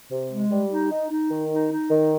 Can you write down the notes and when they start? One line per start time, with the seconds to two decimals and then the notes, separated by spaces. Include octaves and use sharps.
0.11 C3
0.31 G#3
0.51 G3
0.71 D#4
0.91 D#4
1.11 D#4
1.31 D#3
1.51 D#4
1.71 D#4
1.90 D#3